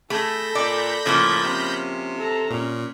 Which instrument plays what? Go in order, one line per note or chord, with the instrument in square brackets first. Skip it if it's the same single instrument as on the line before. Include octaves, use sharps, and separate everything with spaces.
[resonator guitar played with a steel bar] A3 G#4 [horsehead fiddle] A4 [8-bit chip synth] B5 G6 A#6
[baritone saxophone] A#2 [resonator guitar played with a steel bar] D5
[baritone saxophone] A2 [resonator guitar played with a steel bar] C#3 F3 A#3
[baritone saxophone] C3 [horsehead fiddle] C#4
[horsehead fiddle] A4 A#5
[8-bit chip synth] A#2 [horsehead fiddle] C#4